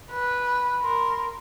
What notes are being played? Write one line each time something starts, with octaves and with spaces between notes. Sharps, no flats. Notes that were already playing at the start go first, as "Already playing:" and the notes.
B4
B5
A#4 C6